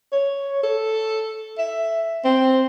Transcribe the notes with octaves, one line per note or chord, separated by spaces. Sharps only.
C#5
A4
E5
C4